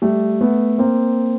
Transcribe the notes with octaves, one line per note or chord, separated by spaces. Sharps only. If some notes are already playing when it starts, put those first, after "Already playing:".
G3 A3
A3 B3
A#3 C4